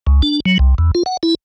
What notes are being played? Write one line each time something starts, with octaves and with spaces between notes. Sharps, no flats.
C#2
D4
F#3
C2
E2
F4
F#5
E4